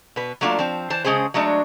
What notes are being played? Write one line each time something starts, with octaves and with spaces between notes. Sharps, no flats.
B2 B4
F#3 A3 A#3 D4 F4
F3 C4
E3 C5 A5
C#3 G#3 C#4 G#4 C5
F#3 G#3 A3 D4